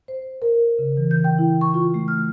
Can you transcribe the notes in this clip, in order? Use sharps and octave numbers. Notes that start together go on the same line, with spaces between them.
C5
A#4
C#3
E3
G6
G5
E4
C#6
F4
A3
F6